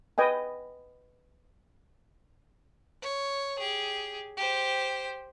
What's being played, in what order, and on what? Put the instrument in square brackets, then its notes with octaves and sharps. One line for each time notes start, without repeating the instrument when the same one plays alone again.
[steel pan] B4 D#5 G5 G#5
[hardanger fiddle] C#5
G4 G#4
G4 C5